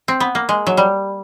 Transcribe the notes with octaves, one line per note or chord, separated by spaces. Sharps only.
C4
B3
A#3
G#3
F#3
G3